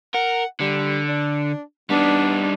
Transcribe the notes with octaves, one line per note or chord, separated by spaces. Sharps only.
A#4 F#5
D3 G3
D4
G3 B3 D4 D#4